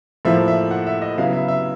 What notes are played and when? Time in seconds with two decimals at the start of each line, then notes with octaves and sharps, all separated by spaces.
0.25 A2 F3 A#3 E5
0.48 E5
0.71 F#5
0.87 E5
1.02 D#5
1.17 C#3 F#3 B3 E4 F5
1.33 E5
1.48 E5